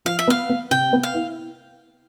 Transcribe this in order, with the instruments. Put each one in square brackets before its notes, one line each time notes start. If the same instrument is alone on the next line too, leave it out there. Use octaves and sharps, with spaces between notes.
[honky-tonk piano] F3 [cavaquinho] F5
[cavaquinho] E5
[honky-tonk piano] B3 [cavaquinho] F5
[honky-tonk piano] B3
[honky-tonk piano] C3 [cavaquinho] G5
[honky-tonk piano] B3
[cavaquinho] F5
[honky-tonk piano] E4